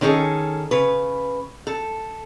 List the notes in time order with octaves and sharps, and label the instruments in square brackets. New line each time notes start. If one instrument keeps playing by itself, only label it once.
[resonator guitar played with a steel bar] D#3 C#4 G#4 A4
C#3 B4
A4